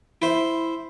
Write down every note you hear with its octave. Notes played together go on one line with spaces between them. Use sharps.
E4 C5